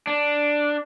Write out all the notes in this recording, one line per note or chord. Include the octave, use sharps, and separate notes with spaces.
D4